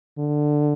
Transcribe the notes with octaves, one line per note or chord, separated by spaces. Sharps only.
D3